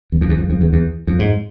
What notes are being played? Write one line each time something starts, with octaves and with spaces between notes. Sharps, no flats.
E2
F2
E2
F2
F2
E2
E2
F2
G#2